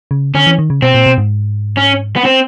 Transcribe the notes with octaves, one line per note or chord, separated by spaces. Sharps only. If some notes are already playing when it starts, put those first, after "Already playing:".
C#3
D3 C#4
E3
D#3
C#3
B2 C4
A#2
B2
G#2
C#4
B3
C4